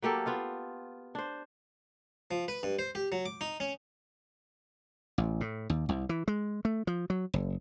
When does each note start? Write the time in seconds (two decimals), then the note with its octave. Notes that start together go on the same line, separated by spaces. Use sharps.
0.02 F#3 A#3 G4 A4
0.26 B3 F4 F5
1.15 D4 C5
2.31 F3
2.48 B4
2.63 G2
2.79 C5
2.95 G4
3.12 F#3
3.26 D6
3.41 D#4
3.60 C#4
5.18 A1
5.41 A2
5.70 D#2
5.89 C2
6.09 E3
6.28 G#3
6.65 A3
6.87 F3
7.10 F#3
7.34 F#1